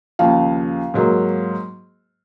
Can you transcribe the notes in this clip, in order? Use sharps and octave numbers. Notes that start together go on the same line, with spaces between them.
D#2 C#3 F3 F5
G#2 F#3 A#3